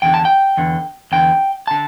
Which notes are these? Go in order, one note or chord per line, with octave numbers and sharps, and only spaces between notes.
E2 D3 G5
A5
G5
E2 D3
E2 D3 G5
D3 A5